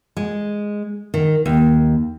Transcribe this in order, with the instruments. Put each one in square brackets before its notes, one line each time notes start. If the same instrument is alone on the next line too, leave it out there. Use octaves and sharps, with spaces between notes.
[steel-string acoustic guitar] G#3
D#3
D#2